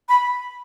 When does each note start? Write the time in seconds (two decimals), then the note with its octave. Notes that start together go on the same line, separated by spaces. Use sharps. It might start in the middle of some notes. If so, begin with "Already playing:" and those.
0.09 B5